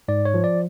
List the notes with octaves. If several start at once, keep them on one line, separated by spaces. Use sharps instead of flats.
G#2 D5
C#5
F3
D5